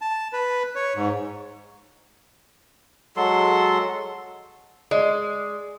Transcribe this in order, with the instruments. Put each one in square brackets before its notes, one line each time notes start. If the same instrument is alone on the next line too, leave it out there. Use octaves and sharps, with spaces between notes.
[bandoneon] A5
B4
C#5
G#2
[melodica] F#3 G#3 A4 C6
[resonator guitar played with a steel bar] G#3 [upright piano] D5